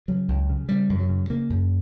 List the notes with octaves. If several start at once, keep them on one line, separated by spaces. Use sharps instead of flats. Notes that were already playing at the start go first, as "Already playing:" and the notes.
C#3 F#3
C#2
C#3
C#3 G3
F#2
F#3
C#3
C#3 A#3
F#2